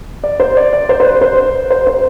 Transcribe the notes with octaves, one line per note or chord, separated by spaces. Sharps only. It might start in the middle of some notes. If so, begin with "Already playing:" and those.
D5
C5
D5
D5
C5
C5
B4
C5
C5
C5